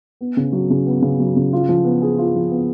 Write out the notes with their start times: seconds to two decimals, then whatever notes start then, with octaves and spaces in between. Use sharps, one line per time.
0.21 B3
0.37 C#3
0.52 F#3
0.70 C#3
0.87 B3
1.02 C#3
1.20 F#3
1.36 C#3
1.53 F4
1.69 F3
1.85 B3
2.02 G#4
2.18 F4
2.35 F3
2.51 B3